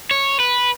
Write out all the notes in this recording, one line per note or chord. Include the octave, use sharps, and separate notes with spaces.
C#5
B4